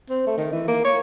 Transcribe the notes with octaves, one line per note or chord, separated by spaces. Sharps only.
C4
A3
D#3
E3
A#3
C#5